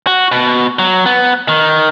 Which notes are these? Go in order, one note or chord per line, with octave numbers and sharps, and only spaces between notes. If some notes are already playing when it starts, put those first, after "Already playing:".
F#4
B2
F#3
B3
D#3